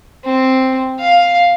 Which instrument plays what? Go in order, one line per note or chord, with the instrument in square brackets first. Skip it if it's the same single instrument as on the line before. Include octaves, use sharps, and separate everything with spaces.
[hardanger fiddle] C4
F5